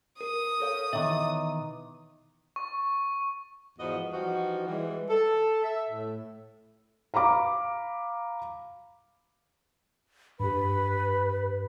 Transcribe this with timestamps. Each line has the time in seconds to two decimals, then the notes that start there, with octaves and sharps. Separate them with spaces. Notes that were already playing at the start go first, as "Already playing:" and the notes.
0.21 A#4 D#6
0.60 A4 C#5 F5
0.93 B2 D#3 E3 D#5 E5 D6
2.56 C#6
3.78 E2 G#2 F3 F#4 B4 D#5
4.11 E3 F3 G3 D#4 F#4
4.66 E3 G3 G#3
5.09 A4
5.62 E5
5.90 A2
7.14 F5 A#5 B5 D6
10.40 G2 G4 B4 B5